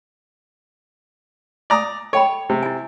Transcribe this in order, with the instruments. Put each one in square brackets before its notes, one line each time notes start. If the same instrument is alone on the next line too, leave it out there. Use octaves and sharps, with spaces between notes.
[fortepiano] D5 A#5 D#6
[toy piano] A4 G5 B5 [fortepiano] C#5
[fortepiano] C3
[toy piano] E4 G#5